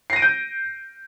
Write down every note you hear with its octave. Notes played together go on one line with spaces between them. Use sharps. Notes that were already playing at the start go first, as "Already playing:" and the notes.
G6 A#6 C7 D7 D#7